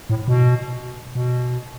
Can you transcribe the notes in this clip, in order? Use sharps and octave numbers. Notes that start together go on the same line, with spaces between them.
A2
B2
B2